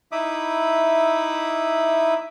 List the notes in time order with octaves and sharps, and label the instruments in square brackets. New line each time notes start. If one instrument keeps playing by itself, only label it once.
[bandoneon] D#4 E4 E5 B5 D6 D#6